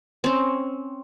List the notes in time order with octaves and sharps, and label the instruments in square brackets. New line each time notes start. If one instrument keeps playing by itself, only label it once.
[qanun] C4 C#4